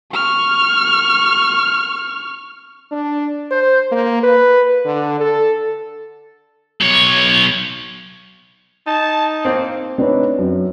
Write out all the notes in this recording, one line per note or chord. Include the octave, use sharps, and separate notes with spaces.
C#6 F6
D4
C5
A#3
B4
D3
A4
B1 C#5
D#4 A5
A#3 C4
C4 D4 D#4 B4 C#5
F#2